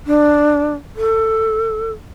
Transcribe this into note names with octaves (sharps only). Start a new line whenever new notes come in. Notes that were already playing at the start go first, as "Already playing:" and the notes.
D4
A4